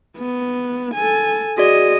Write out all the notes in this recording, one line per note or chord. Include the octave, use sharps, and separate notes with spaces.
B3
A4 G#5
F#4 G#4 D5 D#5